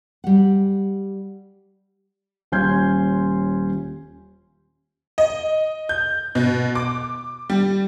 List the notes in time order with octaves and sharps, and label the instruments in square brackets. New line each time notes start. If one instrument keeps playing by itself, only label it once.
[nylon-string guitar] G3 F#5
[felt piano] D#1 C#4 C6 G6 G#6
[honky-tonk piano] D#5
G6
B2
D6
G3